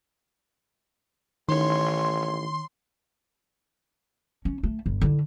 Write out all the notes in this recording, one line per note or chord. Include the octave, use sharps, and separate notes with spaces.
A1 D#3 C#5 C6
C#4
A3
G1
D3 E4